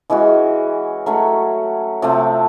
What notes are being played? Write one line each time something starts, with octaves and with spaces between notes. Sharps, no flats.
E3 G#3 C#4 F#4
F#3 A3 C#4
C3 F3 A3 C4